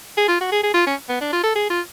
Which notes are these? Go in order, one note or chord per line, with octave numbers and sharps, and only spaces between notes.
G#4
F4
F#4
G#4
G#4
F4
C#4
B3
D4
F4
A4
G#4
F4